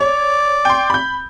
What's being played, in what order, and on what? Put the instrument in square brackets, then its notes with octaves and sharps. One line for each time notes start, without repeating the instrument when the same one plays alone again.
[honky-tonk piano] C#5 [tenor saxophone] D5
[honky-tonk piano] G5 C6
B5 G6